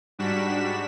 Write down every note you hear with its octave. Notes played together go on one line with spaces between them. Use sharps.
G#2 G3 D4 F#4 B6 E7